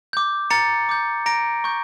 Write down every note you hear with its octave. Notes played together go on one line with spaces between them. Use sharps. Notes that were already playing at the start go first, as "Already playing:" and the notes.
D6 G6
A#5 A6 C#7
D6 G6
A#5 A#6 D7
C#6 G6